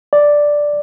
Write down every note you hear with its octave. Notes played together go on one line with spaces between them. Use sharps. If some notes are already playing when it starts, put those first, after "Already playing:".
D5